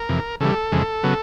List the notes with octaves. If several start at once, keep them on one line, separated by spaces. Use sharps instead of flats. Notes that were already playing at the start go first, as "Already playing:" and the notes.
Already playing: A#4
F2 C3 E3
C#3 E3 G3 A4
F2 C#3 E3 G#3
C#3 F#3 B3